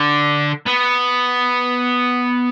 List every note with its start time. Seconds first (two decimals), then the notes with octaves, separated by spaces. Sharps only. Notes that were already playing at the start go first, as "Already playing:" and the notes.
Already playing: D3
0.67 B3